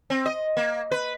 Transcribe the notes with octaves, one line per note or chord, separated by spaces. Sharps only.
C4
D#5
A#3
B4